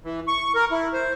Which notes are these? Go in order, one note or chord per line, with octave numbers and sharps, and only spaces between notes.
E3
C#6
A#4
E4
C5